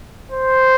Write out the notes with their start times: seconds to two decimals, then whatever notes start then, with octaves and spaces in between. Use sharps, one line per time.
0.32 C5